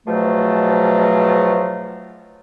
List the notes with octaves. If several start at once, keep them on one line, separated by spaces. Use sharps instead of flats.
G#2 B2 F3 F#3 A3